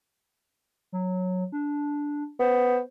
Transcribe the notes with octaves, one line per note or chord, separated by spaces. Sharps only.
F#3
D4
B3 C5